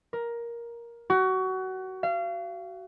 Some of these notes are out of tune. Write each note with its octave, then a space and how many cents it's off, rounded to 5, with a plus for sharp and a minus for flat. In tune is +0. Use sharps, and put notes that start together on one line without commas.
A#4 +10
F#4 +25
F5 -30